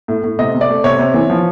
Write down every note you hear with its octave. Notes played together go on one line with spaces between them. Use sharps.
A2
A2
C3 D#5
C3
D5
A3
C3 C#5
C3
E3
F3